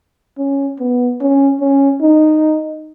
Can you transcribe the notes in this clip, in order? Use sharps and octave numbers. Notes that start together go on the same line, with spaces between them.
C#4
B3
C#4
C#4
D#4